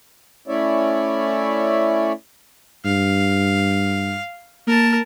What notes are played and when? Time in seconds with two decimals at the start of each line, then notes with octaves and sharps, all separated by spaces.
0.48 A3 C#4 E4 C#5 D5 E5
2.85 G2 F5
4.68 A#3 A#4 A5